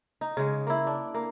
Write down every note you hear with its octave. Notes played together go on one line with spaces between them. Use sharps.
D#4
C#3 G#3
A#3 E4
D4
A#3